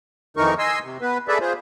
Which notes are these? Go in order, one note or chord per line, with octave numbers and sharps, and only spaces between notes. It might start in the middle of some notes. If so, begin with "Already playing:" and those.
F2 D#3 E3 D#4 A#4 C#6
D#5 G#5 C6 E6
C3
B3 B4
G#4 A4 B4 D5 E5
F4 G#4 C5